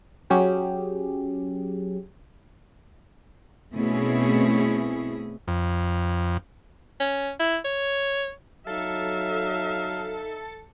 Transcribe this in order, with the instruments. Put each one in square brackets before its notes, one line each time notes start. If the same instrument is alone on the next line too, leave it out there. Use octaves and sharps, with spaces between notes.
[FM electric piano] F#3 C#4 G4 G#4
[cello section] B2 A3 C4 C#4 E4 G#4
[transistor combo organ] F2
[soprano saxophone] C#4
E4
C#5
[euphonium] F#3 [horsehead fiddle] D#4 E5 [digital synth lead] A4 [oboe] F5